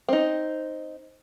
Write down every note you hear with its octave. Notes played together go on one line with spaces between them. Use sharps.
C4 D#4